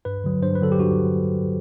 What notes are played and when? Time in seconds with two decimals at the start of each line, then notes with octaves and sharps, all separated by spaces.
0.05 G2 B4
0.24 D3 F#3
0.43 G2 C5
0.55 B4
0.61 D3 F#3 A4
0.72 G4
0.80 G2 F#4